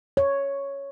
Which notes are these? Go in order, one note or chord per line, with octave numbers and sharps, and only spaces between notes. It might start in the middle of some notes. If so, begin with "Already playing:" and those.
C#5